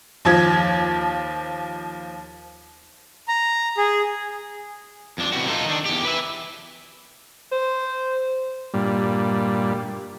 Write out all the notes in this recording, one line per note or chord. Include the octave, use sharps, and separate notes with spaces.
D#2 F3 G#6
A#5
G#4
F2 D4
C3 E3 G3 F#4
D#4 F4 A4
D#3 D4
E2 G4
B4 E5
C5
G2 A#2 G3